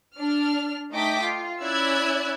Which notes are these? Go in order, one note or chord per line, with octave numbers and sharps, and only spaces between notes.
D4 F6
A3 D#4 D#5 G5 D6 B6
F4
C#4 E4 D5 E6 F#6 G#6